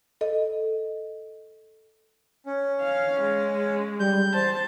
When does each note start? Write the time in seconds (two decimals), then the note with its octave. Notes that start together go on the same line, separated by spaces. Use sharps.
0.21 A4 D#5
2.46 C#4
2.80 F5
3.21 G#3
4.00 G3 G6
4.34 C5 A5